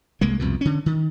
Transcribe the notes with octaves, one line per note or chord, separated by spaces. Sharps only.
C2 G#3 A#3
C2 F2 B2
D3 C#4
D#3